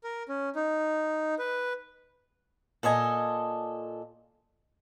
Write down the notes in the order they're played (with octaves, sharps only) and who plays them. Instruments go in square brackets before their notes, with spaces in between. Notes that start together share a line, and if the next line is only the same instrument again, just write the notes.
[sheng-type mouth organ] A#4
C#4
D#4
B4
[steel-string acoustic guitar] A#2 A4 D#5 G#5